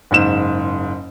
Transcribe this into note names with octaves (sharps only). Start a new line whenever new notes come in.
F#1 G#2 E7